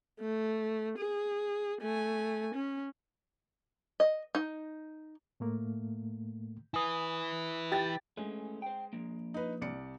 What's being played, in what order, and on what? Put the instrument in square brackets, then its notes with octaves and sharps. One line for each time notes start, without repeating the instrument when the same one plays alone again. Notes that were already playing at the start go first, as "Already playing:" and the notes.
[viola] A3
G#4
A3 G#5
C#4
[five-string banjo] D#5
D#4
[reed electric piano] A2 A3 A#3
[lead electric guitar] E4 B4 [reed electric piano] G#5 D#6
[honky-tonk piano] G4 A6
[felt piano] G#3 [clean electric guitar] A3 C#4
[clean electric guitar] C5 G5
F3 A#3
[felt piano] D#4 B4
C2 D5 C#7